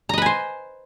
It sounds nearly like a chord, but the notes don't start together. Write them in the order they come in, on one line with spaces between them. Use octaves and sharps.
A#5 D#5 B4 G#5 C5